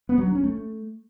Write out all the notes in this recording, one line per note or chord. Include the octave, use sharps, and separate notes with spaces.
B3
F#3
D4
C#4
A3